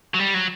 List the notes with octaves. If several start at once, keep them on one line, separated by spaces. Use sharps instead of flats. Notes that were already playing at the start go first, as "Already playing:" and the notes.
F#3
G3
F#3